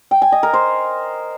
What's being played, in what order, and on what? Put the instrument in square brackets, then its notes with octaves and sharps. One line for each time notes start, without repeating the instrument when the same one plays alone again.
[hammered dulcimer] G5
G#5
D#5
A#4
C5